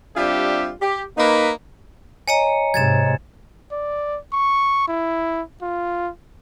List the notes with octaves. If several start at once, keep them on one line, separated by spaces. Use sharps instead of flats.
G3 C4 D4 F4 G4 E5
G4
A#3 D#4 B4
C#5 D#5 G#5 A#5 C#7
G#2 C3 G#6 A6 E7
D5
C#6
E4
F4